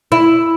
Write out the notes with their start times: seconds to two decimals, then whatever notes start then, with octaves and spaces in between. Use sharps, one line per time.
0.12 E4